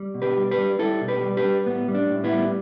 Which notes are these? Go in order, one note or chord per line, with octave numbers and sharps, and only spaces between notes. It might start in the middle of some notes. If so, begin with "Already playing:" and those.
Already playing: G3
B2
G4 B4
G3
G4 B4
G3
G3 E4 A4
B2
G4 B4
G3
G4 B4
G3
A2 B3
G3
D4
A2
B3 E4
G3